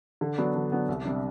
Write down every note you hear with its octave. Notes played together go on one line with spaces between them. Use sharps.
D3
F#3 B3 D4
D3
F#3 B3 D4
C2
C3 G3 D4